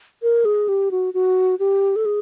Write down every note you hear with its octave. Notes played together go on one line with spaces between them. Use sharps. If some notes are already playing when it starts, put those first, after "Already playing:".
A#4
G#4
G4
F#4
F#4
G4
A4
G#4